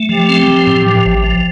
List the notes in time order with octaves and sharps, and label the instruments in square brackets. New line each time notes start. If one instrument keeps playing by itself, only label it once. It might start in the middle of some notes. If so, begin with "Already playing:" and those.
Already playing: [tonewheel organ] A3
[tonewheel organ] F3 [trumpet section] G4
[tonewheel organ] C4
F3
A2
F3
A1
F3